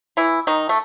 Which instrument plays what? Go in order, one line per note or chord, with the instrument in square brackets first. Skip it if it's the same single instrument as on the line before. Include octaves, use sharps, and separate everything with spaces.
[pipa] E3 E4
D#3 D#4
A3